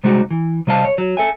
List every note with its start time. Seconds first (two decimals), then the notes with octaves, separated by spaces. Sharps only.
0.04 C3 G3 G#3 D#4 F#4
0.31 E3
0.67 C3 G3 D#5 F5 A5
0.85 C#5
0.98 F#3
1.17 A4 E5 G#5